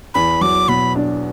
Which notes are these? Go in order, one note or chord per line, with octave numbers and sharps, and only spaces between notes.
E2 B5
F#3 D6
B2 B5
D4